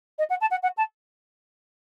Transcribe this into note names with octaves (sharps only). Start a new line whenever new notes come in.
D#5
F#5
A5
F#5
F#5
A5